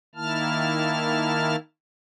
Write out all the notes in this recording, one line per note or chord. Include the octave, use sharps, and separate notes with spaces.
D#3 A#3 E4 A5 F6